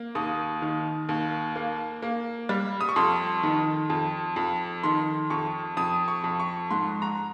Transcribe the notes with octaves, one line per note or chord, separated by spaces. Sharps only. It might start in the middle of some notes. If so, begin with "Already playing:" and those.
Already playing: A#3
D#2 D#6
D#3
D#2
A#3
A#3
G3
D#6
C#6
F2 C6
D#3
F2
F2
D#3 C6
F2 C#6
F2 D#6
C#6
F2
C#6
G#2 C6
A#5